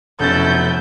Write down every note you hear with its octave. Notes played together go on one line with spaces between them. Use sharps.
F1 B2 F#3 C#4 E4 A4 G6 A6